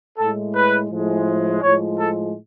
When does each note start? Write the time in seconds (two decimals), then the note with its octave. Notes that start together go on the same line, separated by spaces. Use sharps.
0.18 A2 G#3 A4
0.55 B4
0.91 A2 F3 G#3
1.63 A2 F3 G#3 C#5
1.98 A4